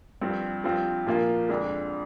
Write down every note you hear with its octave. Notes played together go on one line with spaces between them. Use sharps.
G2 F3 C4
G2 F3 C4 F4
A#2 F3 A#3 F4
F2 D3 G#3 D4